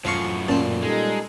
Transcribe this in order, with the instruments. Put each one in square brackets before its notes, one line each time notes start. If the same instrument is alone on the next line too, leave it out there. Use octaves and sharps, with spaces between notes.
[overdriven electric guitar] F#2 A2 [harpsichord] F3 F5 C#6
[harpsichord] A#2 C4 [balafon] C#4
[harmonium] G3 D#4 A4 [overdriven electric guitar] G#3